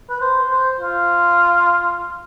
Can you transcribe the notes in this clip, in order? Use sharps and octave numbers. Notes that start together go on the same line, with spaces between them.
B4
C5
C5
F4